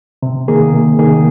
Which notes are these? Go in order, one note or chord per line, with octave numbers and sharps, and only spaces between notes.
C3
D#3 A#3 G#4
C3
D#3 A#3 G#4